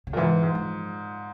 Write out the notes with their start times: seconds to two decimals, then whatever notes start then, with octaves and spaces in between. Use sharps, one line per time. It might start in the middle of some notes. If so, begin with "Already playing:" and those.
0.07 C#3
0.13 A#2
0.17 G#2 E3
0.43 G#2
0.55 F3